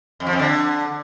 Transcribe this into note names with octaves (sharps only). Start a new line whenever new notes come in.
F2
F3
F2
D3